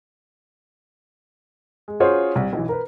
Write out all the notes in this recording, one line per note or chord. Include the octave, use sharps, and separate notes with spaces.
G#3
C#4 F4 F#4 G#4 C5 C#5
C2
B1 E3
A#4 B4